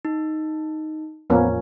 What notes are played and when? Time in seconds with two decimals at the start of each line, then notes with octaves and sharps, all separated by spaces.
0.05 D#4
1.30 E2 A2 F3 A#3 B3 C#4